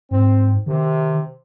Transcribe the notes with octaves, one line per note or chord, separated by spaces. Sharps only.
G#2 C4
C3 D#3